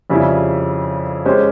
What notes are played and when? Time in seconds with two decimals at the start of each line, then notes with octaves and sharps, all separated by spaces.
0.10 F2 C#3 G3 C#4 E4
1.25 G#3 C#4 G4 C5